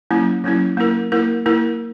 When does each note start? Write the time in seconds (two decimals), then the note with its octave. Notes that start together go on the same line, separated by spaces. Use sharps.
0.11 F#3 A#3 C#4 E4
0.44 F#3 A#3 C#4 E4
0.77 A#3 E4 A#4
1.12 A#3 E4 A#4
1.46 A#3 E4 A#4